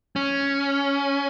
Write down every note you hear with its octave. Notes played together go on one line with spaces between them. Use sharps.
C#4